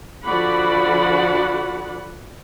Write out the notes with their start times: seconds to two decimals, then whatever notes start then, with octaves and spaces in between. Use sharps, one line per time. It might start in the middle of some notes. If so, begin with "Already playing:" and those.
0.25 D3 F3 F#4 D5 F#5 B5